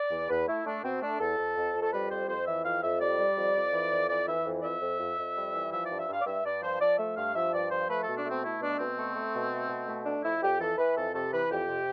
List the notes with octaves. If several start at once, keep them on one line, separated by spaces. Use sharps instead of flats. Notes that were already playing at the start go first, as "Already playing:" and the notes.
Already playing: D5
E2
E2 B4
A3 E4
A3 D4
B2 C4
A3 D4
E2 A4
F2
F2
F2
A4
G3 B4
F2 C5
F2 C5
E3 E5
F2 F5
F2 E5
G3 D5
G3
F2
F2
E3
F2
E3 D5
E3 E5
F2
D5
F2 E5
F2
F2
F2
G3
E3
F3 E5
G2 D5
E5
G2 F5
D5
G2 E5
G2 D5
F3 C5
F3 D5
A3 E5
G2 F5
F3 E5
G2 D5
F3 C5
A3 B4
B2 A4
D4
A3 C4
A3 E4
B2 D4
B2 C4
A3
A3
B2
A3
B2
A3
A3 D4
F2 E4
F2 G4
E3 A4
E3 B4
F2 A4
C3 A4
E3 B4
F2 G4
C3